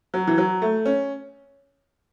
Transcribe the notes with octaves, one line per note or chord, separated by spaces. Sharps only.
F#3
E3
F#3
A3
C#4